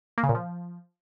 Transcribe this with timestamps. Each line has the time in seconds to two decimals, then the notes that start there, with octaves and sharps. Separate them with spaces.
0.18 A#3
0.23 C#3
0.29 A#2
0.35 F3